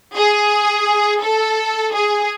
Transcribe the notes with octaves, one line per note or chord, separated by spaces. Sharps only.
G#4
A4
G#4